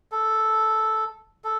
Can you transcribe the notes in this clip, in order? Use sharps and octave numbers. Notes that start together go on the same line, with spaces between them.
A4
A4